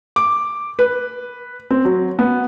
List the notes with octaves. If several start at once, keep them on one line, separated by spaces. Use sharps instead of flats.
D6
B4
C4
F#3
B3